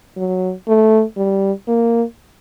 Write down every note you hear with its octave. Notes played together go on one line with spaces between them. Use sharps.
F#3
A3
G3
A#3